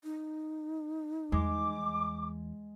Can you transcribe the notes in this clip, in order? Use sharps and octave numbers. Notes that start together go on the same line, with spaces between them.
D#4
E2 G#3 D6